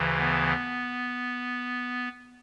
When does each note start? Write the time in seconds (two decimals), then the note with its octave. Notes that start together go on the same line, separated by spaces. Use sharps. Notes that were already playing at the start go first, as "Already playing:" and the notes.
Already playing: D2 C#3 E3
0.17 B3